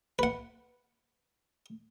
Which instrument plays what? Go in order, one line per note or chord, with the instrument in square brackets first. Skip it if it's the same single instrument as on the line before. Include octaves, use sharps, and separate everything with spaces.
[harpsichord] B4 F#5